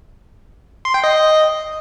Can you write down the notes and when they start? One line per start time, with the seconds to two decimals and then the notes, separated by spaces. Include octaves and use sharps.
0.85 C6
0.94 G5
1.04 D#5